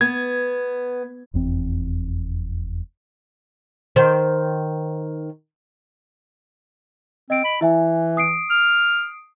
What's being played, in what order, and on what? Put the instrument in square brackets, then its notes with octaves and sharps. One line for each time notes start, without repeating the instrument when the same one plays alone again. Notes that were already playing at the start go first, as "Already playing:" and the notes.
[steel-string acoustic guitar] B3 [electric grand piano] G#6
[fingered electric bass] F1 E2 C4
[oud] D#3 C5
[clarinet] C4 [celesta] D#5 D7
[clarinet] B5
[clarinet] E3 [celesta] E4 E5 G#5
[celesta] D#6 C7 D7
[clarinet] F6